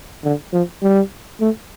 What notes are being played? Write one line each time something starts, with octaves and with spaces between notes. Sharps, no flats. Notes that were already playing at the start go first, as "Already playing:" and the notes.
D3
F3
G3
A3